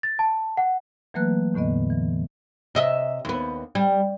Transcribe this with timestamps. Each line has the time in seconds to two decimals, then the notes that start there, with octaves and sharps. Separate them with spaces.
0.03 A6
0.19 A5
0.57 F#5
1.14 E3 F#3 A3 A#3 B4 F#6
1.54 E2 A2 D3 B3 D#5
1.90 E3
2.75 C3 D#5 E5
3.25 D#2 B3
3.75 G3